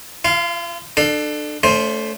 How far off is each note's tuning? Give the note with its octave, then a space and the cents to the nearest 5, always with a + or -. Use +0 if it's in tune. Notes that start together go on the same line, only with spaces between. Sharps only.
F4 -40 F5 +0
D4 +30 A4 +0 F5 +20
A3 +0 C#4 +45 C5 +10